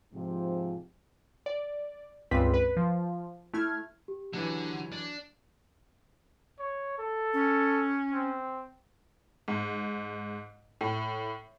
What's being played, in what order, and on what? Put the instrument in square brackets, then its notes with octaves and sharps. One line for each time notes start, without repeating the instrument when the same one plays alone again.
[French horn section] G#2 C3 F3
[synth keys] D5
C#2 G2 G3 C4 B4 B6
B4
F3
A3 E4 F6 G#6
[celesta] G4
[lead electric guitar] D3 [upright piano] E3 F#3
[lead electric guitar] D4
[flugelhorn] C#5
A4
[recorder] C#4
[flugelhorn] C4
[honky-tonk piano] G#2
A2